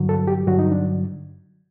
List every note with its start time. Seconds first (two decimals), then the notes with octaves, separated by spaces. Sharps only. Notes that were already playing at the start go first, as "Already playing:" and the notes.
Already playing: G2 D3 F#3
0.09 A4
0.27 G4
0.47 G2 D3 F#3 F#4
0.59 D#4
0.72 D4